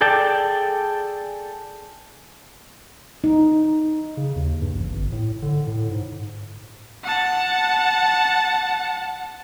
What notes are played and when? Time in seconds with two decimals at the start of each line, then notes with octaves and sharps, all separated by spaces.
0.01 G#4 A4 D5 G5 A5
3.24 D#4
4.17 C#3
4.36 D#2
4.61 G2
4.75 A1
4.91 G1
5.12 A2
5.42 D3
5.67 A2
5.91 G#2
7.03 F#5 A5